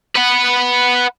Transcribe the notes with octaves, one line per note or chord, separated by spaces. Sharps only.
B4 F#5